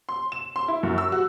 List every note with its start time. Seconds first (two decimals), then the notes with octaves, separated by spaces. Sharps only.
0.09 C6
0.32 E7
0.56 C6
0.68 E4
0.83 F#2
0.98 E6
1.12 F#4